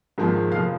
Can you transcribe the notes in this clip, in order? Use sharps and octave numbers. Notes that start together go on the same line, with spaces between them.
G#1 G#2 F3 A#3
F1 F3 F5